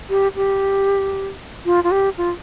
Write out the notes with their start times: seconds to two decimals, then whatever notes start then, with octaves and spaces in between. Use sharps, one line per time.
0.10 G4
0.36 G4
1.66 F4
1.84 F4
1.91 G4
2.18 F4